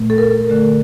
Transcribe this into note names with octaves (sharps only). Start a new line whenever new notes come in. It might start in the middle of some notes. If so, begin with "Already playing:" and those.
Already playing: A#2 A3
A4
A#4
D3 A3